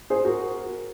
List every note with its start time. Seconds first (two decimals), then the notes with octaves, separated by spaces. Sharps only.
0.10 G#4 C5
0.25 F#4 A#4